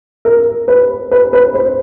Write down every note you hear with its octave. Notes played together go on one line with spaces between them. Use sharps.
A#4
B4
B4
B4
C5